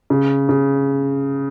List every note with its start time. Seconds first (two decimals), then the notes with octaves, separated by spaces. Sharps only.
0.10 C#3
0.49 C#3